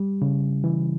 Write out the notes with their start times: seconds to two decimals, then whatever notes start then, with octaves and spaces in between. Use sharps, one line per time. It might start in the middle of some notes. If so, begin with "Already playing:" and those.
Already playing: G3
0.22 C#3
0.64 E3